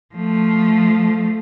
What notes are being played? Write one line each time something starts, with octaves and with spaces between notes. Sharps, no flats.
F3 A3